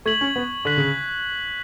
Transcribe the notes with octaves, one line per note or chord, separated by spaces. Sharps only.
A3 C#6 G#6 B6 F#7
C#4
B3
D3 C#6 F#6 B6 F#7
C#3